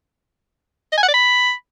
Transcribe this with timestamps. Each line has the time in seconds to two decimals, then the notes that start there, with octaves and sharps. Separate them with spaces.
0.92 D#5
0.97 G#5
1.03 F#5
1.08 D5
1.14 B5